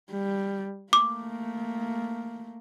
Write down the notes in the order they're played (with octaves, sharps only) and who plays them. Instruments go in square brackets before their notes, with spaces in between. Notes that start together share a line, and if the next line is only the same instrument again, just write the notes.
[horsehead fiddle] G3
[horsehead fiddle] A3 A#3 [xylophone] D6